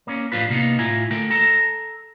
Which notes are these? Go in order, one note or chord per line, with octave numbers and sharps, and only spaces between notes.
A#3 C#4
A2 F3 D4 F4 B4
C3 A#3 B3 D#4
A2 E4 F4 G#5 A#5
D3 A3 A#4 G5
A4 A5 A#5